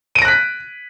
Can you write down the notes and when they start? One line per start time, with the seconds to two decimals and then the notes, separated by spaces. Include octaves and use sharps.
0.15 D#7
0.19 D7
0.22 A#6
0.25 F#6
0.28 B6